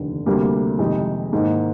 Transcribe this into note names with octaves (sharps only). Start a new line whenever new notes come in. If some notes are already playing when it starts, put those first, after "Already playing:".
Already playing: F1 D#2 D3
D2 C3 G3 A#3
F2 C3 D#3 G#3 D#4
G#2 D#3 A#3